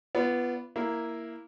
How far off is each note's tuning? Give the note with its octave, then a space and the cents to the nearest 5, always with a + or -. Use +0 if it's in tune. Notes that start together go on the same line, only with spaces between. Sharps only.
B3 +0 F4 -35 D5 -10
A#3 +0 E4 +0 F5 -25